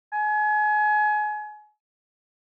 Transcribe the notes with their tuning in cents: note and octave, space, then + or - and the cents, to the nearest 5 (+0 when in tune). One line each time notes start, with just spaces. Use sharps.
G#5 +30